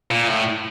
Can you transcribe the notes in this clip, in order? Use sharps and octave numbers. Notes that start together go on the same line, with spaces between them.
A#2
A2